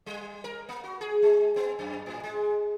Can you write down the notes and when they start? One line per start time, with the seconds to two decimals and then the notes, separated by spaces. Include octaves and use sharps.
0.06 G3
0.44 A#4
0.69 A#3
0.84 F#4
1.01 G#4
1.22 G#3
1.56 B3
1.79 F#2
2.06 A2
2.24 G#3